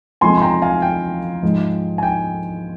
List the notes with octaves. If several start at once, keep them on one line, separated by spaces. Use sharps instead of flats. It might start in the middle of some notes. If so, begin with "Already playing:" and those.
F2 C3 F3 G#3 G#5 C6
C6
G5 A#5
F5 G#5
G5
G#2 F3 G#3
G#5
G5